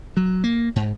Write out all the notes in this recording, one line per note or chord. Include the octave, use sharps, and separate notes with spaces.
F#3
A#3
G#2